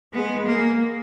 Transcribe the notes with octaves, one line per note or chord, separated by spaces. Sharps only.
G#3 B3
A#3